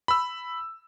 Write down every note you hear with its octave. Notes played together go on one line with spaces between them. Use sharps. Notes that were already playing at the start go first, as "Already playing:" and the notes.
B5 E6